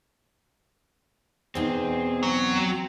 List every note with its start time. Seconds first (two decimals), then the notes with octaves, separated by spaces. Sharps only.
1.55 E2 B2 C4 D#4 G#4
2.23 F#3 A#5